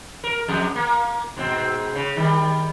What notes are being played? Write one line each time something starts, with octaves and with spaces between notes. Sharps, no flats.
A#4
F2 G#4
A#3
G#2 B2 C4
C#3
D#3 G3